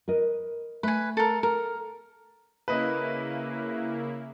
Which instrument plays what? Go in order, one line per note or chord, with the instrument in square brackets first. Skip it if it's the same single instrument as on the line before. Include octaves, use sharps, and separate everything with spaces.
[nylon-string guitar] A#4 B4 D#5
[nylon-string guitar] A3 [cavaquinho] B4 G#5
[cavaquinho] A4 A#4
[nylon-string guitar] A4 [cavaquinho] A#4
[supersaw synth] C#3 A#3 E4 [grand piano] B4 D#5